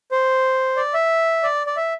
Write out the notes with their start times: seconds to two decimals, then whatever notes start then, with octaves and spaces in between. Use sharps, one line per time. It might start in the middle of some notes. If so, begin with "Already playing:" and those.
0.11 C5
0.77 D5
0.94 E5
1.43 D5
1.67 D5
1.76 E5